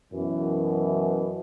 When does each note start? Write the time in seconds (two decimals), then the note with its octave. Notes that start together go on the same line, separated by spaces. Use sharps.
0.13 F#2 B2 E3